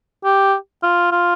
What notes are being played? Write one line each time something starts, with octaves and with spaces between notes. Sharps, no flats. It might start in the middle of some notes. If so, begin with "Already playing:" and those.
G4
F4
F4